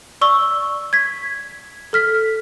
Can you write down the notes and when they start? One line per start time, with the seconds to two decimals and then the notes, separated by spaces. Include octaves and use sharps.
0.21 D5 C#6 E6 G7
0.93 G#6 B6
1.93 A4 F6 B6